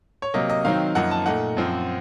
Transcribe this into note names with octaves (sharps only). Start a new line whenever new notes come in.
C#5
C3 F#3 A#3 D#5
D#5
D#3 F#3 C4 D#4 F5
F#2 F3 A#3 D#4 F#5
A5
A#2 A3 D#4 F#5
F#2 F3 C4